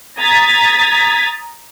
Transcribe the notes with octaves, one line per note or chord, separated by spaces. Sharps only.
A#5 D#6 G#6 A6 B6